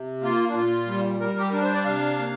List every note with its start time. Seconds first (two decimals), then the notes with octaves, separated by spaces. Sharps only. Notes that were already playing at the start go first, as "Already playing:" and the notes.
Already playing: C3
0.22 A#3 F4
0.49 D4
0.54 A#2 F4
0.87 G3
1.20 G3 A#4
1.39 G4
1.50 D4 A#4
1.62 C5
1.73 D5
1.85 C3 F5
2.18 A#3